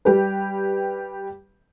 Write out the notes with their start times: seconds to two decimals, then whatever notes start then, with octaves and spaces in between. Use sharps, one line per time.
0.05 G3 G4 B4